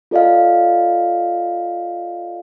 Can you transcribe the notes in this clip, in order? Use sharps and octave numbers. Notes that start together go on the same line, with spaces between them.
F4 A4 D5 D#5 F5